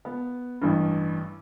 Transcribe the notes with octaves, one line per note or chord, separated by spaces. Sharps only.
B3
A1 G2